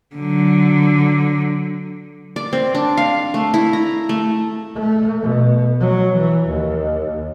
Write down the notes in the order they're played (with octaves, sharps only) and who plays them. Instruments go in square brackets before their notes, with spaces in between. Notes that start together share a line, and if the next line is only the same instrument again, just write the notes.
[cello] D3 F#3
[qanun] D5
C4
D4
F5
A3
E4
A#5
A3
[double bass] A3
B2
F#3
E3
D#2